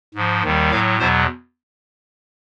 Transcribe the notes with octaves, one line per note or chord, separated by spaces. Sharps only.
G#2 F3
D#2 D#3 G3
A2 F#3 F5
E2 B2 F#3 C5